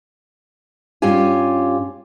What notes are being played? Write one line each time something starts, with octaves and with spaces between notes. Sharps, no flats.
G2 C#4 F4 G4 G#5